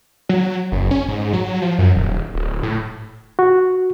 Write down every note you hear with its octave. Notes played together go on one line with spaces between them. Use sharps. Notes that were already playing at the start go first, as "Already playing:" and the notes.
F#3
F#1
C#4
G#2
F#3
F3
F#2
D#1
D1
A2
F#4